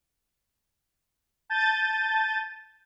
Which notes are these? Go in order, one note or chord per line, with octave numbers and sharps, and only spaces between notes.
A5 G6 A6 D#7